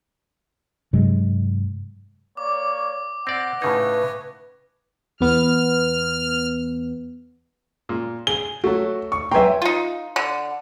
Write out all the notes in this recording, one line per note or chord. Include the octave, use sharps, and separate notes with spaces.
G2 C3 F#3 G#3
A#3 C#5 D5 D6
C4 D5 F#5 A#6
A2 C#3 D#4 B4 G#6
E2 B3 F6
A#2
G#4 G7
F#3 A3 F#4
C#6
F#3 B4 E5 G5 G#5 A#5 C6
D#4 F4
D3